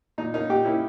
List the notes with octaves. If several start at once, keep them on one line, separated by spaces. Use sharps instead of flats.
A#2 D#4
A#3 C#4 D#4
A#2 G4
A#3 C#4 E4